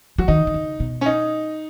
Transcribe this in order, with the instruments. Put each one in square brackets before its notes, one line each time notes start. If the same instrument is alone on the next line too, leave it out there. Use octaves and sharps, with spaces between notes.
[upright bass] F#3 [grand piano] F#4
[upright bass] D#3 [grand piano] D#4
[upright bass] D#3
C#3
B2
[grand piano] C#4
D#4